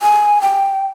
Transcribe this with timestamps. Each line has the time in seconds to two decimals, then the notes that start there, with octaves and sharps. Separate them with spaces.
0.02 G#5
0.42 G5